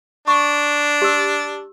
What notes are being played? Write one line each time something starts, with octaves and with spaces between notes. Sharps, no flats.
D4 C#6
G4 E6